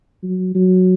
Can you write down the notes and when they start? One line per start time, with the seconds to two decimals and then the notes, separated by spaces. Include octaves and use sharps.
0.23 F#3
0.55 F#3